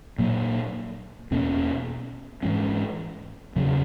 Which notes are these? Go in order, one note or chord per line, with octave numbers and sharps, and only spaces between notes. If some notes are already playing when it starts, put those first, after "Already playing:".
A#2 F#3 A#3
E2 B2 A#3 C#4
G#2 E3 G#3 C#4
E2 C#3 F#3